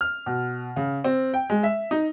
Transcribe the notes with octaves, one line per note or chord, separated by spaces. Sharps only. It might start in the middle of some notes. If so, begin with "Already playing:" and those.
F6
B2
C#3
C4
G5
G#3
E5
D#4